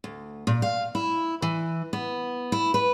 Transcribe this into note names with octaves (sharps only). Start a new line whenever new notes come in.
D2
A#2
F5
E4
E3
B3
E4
B4